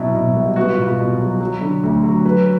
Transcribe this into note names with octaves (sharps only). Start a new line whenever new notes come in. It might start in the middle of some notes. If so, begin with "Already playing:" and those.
Already playing: B2 F#3 E4
B2
C2
B3 F#4
F4
B2
F#4
B2
F#3
F#3
D3
D2
F#3
F#3 B4